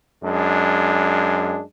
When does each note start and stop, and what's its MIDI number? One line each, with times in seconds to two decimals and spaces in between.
0.24 1.62 42
0.24 1.62 56
0.24 1.62 62